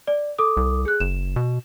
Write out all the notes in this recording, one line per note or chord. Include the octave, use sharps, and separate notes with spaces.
D5
A4 D6 D#6
C2
G#4 F#6
F#1 E7
B2